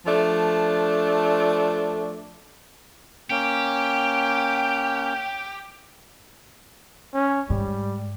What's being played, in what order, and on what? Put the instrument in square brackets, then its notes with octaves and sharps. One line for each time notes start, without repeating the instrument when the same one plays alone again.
[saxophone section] F3 A3 D4
[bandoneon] A#3 C#4 [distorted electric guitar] G4 [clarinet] G5
[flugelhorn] C#4
[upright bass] G#2 [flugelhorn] G3